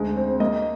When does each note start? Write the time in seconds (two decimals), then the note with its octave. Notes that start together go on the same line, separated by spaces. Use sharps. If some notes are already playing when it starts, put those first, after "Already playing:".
Already playing: D2 G#3
0.16 C4
0.40 A#3 D#5